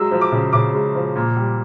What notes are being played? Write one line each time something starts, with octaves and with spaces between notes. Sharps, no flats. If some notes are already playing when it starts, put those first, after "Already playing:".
Already playing: F#3 G#3 E6
F3
D6
C#3
C#3 D6
G#3
F3
A#2
G3